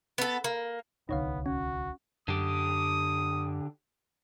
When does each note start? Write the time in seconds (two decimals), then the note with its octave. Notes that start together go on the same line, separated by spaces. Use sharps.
0.18 B3 A4
0.44 A#3
1.09 D1 C2 D3 B3 D#4 C#5 F5
1.46 C#4 F#4
2.28 F#2 D3 G4 D#6